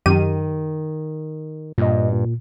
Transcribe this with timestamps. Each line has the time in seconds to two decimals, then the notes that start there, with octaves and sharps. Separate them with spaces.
0.06 F#2 D#3 G4 D#7
1.78 G2 A#2 D#5
2.13 A#2